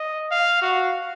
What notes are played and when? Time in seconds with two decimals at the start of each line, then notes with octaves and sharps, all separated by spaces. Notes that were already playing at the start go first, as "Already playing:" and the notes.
Already playing: D#5
0.31 F5
0.62 F#4